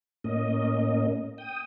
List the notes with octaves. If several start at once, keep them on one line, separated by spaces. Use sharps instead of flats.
A2 A#3 C#4 D#5
G5 D#6